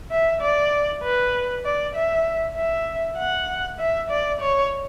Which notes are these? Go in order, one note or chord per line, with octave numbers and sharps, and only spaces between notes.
E5
D5
B4
D5
E5
E5
F#5
E5
D5
C#5